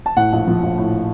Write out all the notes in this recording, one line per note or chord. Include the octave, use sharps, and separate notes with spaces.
A5
A2 F#5
A#1
F3
A#1
A2